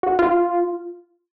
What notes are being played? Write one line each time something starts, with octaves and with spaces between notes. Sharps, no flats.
F#4
F4